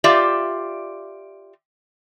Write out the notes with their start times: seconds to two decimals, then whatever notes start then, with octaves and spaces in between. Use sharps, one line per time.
0.04 F4 G4 D5 E5